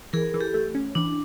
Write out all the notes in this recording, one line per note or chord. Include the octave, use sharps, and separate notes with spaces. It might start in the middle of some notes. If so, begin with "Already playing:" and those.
E3 G#4 A#4
E3
G4 A4
A3
C#4
E3 D4